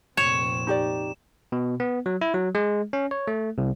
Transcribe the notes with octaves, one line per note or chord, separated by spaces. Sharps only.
F1 A#2 C4 C#5 E7
D#4 G4 D5
B2
B3
F#3
E4
F#3
G#3
C#4
C#5
A3
C2